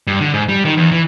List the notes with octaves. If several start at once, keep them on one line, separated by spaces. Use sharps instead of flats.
G2
D3
G#2
G3
D#3
E2
E3